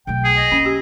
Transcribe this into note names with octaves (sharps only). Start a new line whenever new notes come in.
B1 A3 G5
G#4
D#5
A#3 C#4
G4